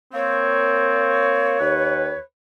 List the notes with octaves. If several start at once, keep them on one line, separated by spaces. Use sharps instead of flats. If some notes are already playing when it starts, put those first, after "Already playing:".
A#3 C4 C#5
D#2 B4